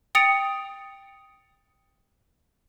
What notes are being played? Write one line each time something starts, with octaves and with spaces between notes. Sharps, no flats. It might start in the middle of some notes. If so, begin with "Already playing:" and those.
G5 D#6 A6 C#7 D7 F7